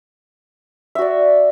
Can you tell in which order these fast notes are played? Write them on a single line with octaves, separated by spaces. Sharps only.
E5 F#4 D5